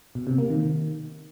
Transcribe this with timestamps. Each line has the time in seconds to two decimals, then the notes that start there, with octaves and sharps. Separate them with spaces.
0.15 B2
0.27 C3
0.38 A#3
0.50 D#3